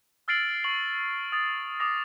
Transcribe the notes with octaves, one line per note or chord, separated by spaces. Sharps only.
E6 F6 A6 C7 D7 F#7
C#6 F#7
D#6 A6
D6 D#6 A#6